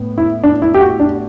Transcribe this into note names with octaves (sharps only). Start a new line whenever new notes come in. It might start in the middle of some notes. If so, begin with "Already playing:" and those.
Already playing: A2 B3
E4
D4
E4
G4
F#4
D4